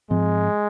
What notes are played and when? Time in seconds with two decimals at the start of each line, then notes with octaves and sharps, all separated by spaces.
0.10 G#2 F3 G#3 C4